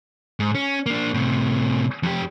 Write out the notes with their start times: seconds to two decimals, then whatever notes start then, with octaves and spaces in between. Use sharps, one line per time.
0.40 G#2
0.55 C#4
0.86 A#3 D4
1.14 A2 C3
2.03 F2 G4